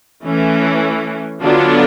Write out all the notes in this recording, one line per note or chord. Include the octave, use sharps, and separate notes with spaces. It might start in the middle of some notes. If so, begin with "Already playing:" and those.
E3 A3 C#4
D3 F#3 B3 D4 F4